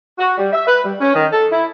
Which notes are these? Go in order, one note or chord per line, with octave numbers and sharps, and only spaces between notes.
F#4
G3
E5
B4
G3
C#4
D#3
A4
E4